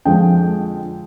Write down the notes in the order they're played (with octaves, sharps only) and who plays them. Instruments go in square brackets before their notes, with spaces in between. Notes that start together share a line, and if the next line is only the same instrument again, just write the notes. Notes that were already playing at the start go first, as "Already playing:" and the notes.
[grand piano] F2 D3 F3 G#3 G5